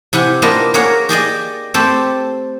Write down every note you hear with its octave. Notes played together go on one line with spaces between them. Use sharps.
C3 E4 G4 F#5 G#5
A#3 B3 D4 F4 B4 D#5
A#3 G#4 A#4 C#5 F#5
G4 G#4 D5 D#5
A3 C4 G4 A4